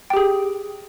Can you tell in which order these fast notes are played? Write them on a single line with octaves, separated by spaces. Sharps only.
G5 G4 G#4